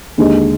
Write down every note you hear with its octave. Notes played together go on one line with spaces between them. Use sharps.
D#2 D3 G#3